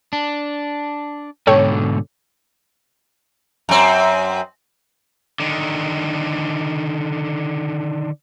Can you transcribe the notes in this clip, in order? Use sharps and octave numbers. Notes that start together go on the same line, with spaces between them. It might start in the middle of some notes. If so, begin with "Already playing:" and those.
D4
G#2 B2 D3 A4 C#5 G5
F#2 C4
D3 D#3